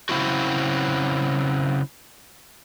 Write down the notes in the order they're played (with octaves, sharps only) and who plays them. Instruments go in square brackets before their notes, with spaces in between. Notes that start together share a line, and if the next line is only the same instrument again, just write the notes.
[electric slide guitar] C#3 F#3 G#3 C4 E4 F#4